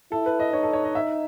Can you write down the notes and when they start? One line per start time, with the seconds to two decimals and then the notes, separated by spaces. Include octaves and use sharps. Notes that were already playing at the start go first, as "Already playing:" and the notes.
0.11 E4 A4
0.26 B4
0.40 D#5
0.53 D#4 C#5
0.63 A4
0.73 C#5
0.84 D#5
0.95 E5